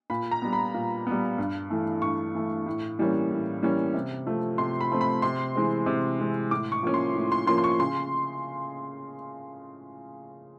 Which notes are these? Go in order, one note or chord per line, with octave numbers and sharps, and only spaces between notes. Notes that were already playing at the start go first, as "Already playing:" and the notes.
A#2 B5
A#5
G3 B3
B5
A#2
G3 B3
G2
E3 A3
G2 C#6
E3 A3
A2
E3 G3 A#3 C#4
A2
E3 G3 A#3 C#4
C3
F3 A3 C4
C3 C6
B5
F3 A3 C4
B5
C3 C6
E3 G#3 C4
C3
E3 G#3 C4
A2 D6
C#6
F3 A#3 C#4
C6
A2
C6
F3 A#3 C#4 C6
C6
C#6
C#3 C6